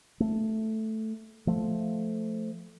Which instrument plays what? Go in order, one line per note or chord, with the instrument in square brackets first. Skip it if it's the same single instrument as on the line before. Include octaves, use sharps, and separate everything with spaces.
[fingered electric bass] A3
F3 A3